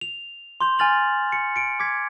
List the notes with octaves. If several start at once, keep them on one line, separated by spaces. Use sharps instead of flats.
F7
C6 D6 G6 F7
G#5 C6 F6 A6 F7 F#7
C#7
C#7 D7
D6 G#6 B6